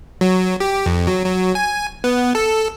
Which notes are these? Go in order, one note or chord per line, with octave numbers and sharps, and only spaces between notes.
F#3
G4
F2
F#3
F#3
G#5
B3
A4